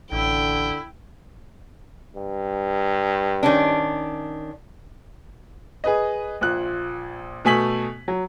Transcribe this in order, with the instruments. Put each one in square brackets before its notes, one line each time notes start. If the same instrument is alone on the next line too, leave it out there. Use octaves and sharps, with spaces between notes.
[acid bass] A1 [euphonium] D3 [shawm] E4 [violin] G5
[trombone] G2
[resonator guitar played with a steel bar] D#3 C#4 D4
[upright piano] G#4 B4 D#5
A#1 A#2 F#6
B2 A3 G#5 B6 F#7
F#3